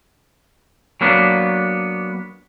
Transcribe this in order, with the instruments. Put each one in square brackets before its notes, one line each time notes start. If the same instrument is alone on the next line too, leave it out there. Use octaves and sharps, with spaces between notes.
[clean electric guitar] F#3 A#3 B3 D4